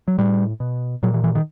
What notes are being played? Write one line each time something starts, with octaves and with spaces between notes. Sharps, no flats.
F#3
A2 G3
B2
A#2 F#3
E3
E3
D#3